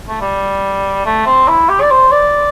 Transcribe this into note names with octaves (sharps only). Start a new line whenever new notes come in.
A3
G3
A3
C4
E4
G4
D5
C5
D5